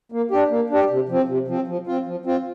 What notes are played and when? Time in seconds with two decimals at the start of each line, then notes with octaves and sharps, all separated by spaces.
0.12 A#3
0.31 D4 G4
0.51 A#3
0.70 D4 G4
0.90 C3
1.09 F3 C4
1.28 C3
1.48 F3 C4
1.67 F3
1.87 C4 F4
2.06 F3
2.26 C4 F4